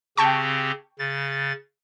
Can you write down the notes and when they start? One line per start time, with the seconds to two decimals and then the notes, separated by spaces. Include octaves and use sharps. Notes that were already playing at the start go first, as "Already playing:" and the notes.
0.17 C#3 C4 G4 G5 A5 C#6
0.99 C#3 A6